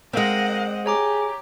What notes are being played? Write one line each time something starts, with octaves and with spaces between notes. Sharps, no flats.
G#3 C4 A#4 D#5 F5 F#5 A#6
G4 G#4 C#5 A#5 D6